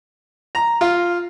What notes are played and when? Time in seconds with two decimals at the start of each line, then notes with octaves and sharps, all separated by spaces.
0.55 A#5
0.81 F4